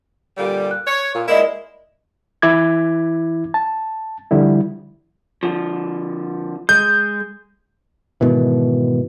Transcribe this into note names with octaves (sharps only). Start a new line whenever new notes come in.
A#2 D3 G3
F#6
C#5
A#2
G#3 A#3 E4 A#4 D5 D#5
E3 E4 D6 G#6
A5
D3 F3 G3 E4
D3 F3
G#3 G6
G#2 B2 D#3 E3